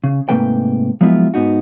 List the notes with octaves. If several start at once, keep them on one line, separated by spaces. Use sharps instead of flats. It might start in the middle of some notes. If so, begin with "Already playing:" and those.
C#3
G#2 C3 A3 A#3 B4 G5
F3 F#3 G#3 B3 E4 F4
G#2 B3 D#4 F#4